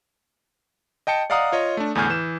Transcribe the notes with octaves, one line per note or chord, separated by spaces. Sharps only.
D#5 G5 A5 C#7
D5 D#5 F5 F#5 A#5 D#6
F4 C#5 D#5
A3 D4
E2 A2 D3 G#5 F6 G6
E3 E7